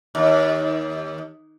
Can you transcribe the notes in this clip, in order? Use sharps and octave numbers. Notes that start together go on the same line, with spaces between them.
D#2